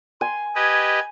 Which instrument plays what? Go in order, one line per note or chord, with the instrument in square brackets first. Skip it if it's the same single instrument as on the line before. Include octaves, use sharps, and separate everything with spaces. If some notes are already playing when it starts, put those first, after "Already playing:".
[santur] G#5 [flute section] C6
[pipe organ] G4 B4 D#5 [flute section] G#6